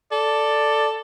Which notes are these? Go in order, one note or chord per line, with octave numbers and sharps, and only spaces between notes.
A4 D5